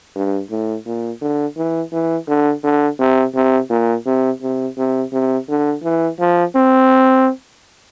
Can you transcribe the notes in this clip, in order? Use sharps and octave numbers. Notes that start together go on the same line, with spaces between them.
G2
A2
A#2
D3
E3
E3
D3
D3
C3
C3
A#2
C3
C3
C3
C3
D3
E3
F3
C4